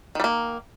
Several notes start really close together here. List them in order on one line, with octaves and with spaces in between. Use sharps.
D#3 G3 A#3